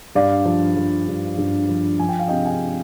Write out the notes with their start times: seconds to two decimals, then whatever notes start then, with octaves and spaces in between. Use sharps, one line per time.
0.15 G2 D5 F5
0.45 F3
0.77 F3
1.08 G2
1.38 G2
1.69 F3
1.99 F3 G#5
2.09 G5
2.19 F5
2.28 C3 D#5 G5
2.45 F5 G#5